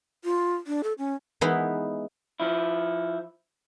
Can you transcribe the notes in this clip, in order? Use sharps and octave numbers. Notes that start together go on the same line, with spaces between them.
F4
D4
A4
C#4
E3 G#3 B3 D#4 E4 B4
F3 E4